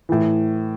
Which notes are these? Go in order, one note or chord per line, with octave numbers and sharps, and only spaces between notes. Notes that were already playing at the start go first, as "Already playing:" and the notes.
A2 E3